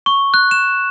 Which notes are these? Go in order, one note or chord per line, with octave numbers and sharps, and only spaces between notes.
C#6
F#6
E7